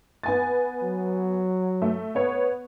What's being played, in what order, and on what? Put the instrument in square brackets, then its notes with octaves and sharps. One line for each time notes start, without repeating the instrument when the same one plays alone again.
[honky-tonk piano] B3 G#5 A6
[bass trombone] F#3
[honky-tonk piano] A3
B3 C#5